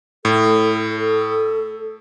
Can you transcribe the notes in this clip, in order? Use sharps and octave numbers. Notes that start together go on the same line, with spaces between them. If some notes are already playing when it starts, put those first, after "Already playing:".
A2 A4
A4